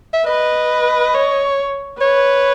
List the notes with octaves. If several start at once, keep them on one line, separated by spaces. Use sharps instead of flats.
E5
B4 D#5
C#5
B4 C#5